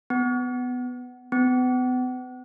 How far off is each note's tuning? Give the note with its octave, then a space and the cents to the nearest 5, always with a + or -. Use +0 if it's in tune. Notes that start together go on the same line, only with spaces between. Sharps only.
B3 +15
B3 +35